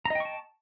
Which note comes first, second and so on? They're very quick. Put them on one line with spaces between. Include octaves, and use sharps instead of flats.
A#5 D#5 G5 C#6 A5